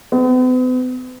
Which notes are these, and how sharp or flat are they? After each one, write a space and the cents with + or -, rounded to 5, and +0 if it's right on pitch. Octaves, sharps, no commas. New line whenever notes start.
B3 +45